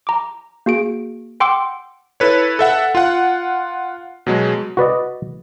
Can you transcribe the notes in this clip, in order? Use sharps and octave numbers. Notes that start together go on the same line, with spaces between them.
A#5 D6
A#3 F#4 G#4 D7
F#5 G5 C6 D6 E6
E4 A4 B4 C#5
A4 E5 F#5
F4 F#5
B2 F#3 G#3
F#4 B4 D5 D#5